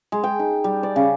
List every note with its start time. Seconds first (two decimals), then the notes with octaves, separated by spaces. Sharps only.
0.12 G#3
0.24 G5
0.39 D#4
0.64 G3
0.83 D5
0.96 C#3